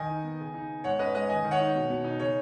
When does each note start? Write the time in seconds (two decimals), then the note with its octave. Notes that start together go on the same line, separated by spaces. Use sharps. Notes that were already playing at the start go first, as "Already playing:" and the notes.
Already playing: D#3 D#5 G#5
0.09 D#4
0.24 B3
0.40 C#3
0.54 D#4
0.69 B3
0.84 G#2 C#5 F#5
0.99 C#4 B4 D#5
1.14 G#3 B4 D#5
1.29 D#3 D#5 G#5
1.44 D#3
1.51 C#5 F#5
1.59 D#4
1.75 B2
1.90 B2
2.04 D#4
2.19 C#3 C#5